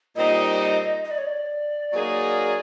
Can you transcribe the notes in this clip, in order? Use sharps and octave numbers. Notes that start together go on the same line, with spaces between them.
A#2 G3 C4 D#4 D#5
D#5
D5
C#5
D5
F#3 A#3 D#4 G#4